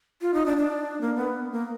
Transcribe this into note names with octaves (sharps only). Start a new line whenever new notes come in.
F4
D#4
D4
D4
A#3
B3
A#3